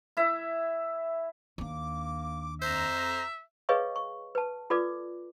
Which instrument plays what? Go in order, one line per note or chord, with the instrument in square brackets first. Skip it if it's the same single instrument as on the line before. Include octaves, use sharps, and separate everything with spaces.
[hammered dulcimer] E4 E5
[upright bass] D#2 D4 [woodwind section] A#3 D6
[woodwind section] F2 A#5 [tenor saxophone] C5 [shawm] E5
[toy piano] G#4 B4 C#5 D#5 F5 C#6
C#6
B4 A5
F4 A4 B4 D5 D6